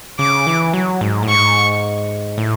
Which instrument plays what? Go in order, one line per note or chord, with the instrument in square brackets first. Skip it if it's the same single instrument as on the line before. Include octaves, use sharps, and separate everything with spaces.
[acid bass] C#3 [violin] D6
[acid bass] E3
F#3
G#2
A2
[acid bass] G#2 [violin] C#6
[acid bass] A2